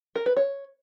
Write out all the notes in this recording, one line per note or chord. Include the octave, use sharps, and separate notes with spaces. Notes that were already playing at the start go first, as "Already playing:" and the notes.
A#4
B4
C#5